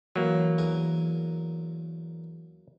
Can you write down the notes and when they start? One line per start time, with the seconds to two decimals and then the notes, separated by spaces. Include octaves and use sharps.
0.16 E3 F#3 A#3
0.58 E2 A#4 G#5